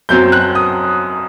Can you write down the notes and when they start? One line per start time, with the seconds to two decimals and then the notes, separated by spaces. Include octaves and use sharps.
0.09 F#2 F#3 C4 G6
0.32 F#6
0.55 D#6